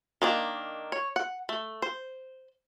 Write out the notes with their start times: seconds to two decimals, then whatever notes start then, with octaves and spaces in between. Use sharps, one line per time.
0.22 D#3 A#3 D4
0.92 C#5
1.16 F#5
1.49 A3
1.82 C5